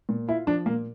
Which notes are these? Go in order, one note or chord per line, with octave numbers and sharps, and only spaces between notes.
A#2
E4 F4
F3 D4
A#2 A#3